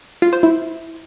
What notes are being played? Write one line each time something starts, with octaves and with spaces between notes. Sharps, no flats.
F4
C5
E4